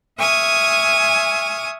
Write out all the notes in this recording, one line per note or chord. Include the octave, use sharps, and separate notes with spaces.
E5 G#5 C#6 D#6 F6